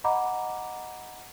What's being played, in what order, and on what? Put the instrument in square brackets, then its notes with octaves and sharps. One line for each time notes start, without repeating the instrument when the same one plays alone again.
[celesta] D#5 F#5 A#5 B5 D6